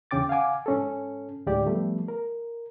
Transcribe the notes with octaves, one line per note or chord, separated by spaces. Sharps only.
E2 C#3 C#4 G5 D6 A6
F5 F#5 G#5 D6
G#2 C#4 A4
D2 A2 G#3 G4 D5
F3 G3 A3 B3
A#4